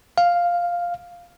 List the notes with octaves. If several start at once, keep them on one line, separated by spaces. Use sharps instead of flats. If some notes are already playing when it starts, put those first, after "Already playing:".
F5